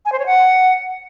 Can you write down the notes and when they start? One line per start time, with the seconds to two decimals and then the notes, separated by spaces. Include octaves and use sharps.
0.05 G#5
0.12 C5
0.19 C#5
0.26 F#5